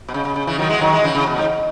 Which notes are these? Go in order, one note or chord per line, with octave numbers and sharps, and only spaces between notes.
B2
C#3
C#3
C#3
C#3 E3
D#3 F#3
E3 G#3
D#3 F#3
E3 G#3
C#3 E3
C#3
B2
G#2